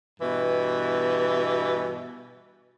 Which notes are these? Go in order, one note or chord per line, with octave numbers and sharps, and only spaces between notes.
G2 B2 E3